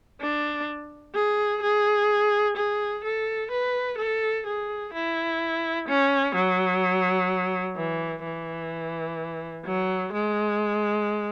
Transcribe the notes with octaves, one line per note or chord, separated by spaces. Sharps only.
D4
G#4
G#4
G#4
A4
B4
A4
G#4
E4
C#4
F#3
E3
E3
F#3
G#3